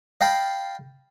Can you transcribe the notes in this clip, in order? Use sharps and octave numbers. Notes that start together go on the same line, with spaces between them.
D#5 F5 G5 A5 B5